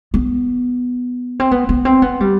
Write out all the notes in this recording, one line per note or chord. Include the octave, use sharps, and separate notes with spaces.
B3
C4
B3
B3
C4
B3
G3